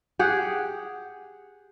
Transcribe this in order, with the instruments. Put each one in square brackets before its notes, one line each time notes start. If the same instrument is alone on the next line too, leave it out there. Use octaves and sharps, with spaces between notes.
[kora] G4 G#4 F#5